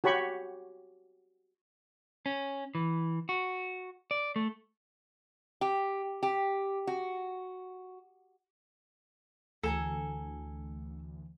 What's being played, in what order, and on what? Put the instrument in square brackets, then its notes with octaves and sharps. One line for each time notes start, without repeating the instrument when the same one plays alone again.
[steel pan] F#4 G4 C#5 B5 C#6
[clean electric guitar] C#4
E3
F#4
D5
A3
[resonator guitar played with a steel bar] G4
G4
F#4
[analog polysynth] D2 [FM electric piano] E3 A3 [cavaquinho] G#4 G#5 A#5 [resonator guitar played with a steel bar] A4